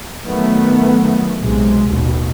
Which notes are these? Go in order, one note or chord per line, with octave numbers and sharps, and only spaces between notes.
D#3 F#3 A3 B3
B1 C3 G#3
A1 D#2 B2